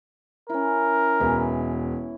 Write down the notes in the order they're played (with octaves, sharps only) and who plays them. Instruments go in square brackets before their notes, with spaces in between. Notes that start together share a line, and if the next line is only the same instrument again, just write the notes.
[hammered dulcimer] C#4 E4 [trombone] A#4
[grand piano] E1 [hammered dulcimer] E3 E4